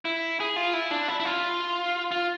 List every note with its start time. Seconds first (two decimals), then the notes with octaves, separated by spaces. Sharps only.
0.05 E4
0.40 G#4
0.56 F4
0.74 E4
0.91 D4
1.08 E4
1.20 E4
1.25 F4
2.12 F4